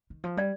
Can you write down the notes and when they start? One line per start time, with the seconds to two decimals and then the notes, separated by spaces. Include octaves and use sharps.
0.10 D#3
0.24 F3
0.37 G3 D5